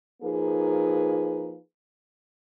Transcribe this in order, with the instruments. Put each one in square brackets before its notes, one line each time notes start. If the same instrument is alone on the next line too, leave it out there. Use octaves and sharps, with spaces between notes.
[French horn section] F3 A#3 D#4 G#4 B4